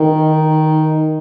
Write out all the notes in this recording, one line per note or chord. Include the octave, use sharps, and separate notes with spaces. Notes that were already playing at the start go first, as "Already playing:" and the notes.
Already playing: D#3